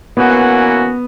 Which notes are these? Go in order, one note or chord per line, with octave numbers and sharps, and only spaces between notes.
E3 A#3 B3 C#4 F#4